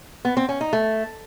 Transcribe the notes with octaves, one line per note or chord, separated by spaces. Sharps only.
B3
C4
C#4
D#4
A3